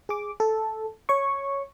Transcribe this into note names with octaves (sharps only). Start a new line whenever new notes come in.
G#4 D6
A4
C#5 C#6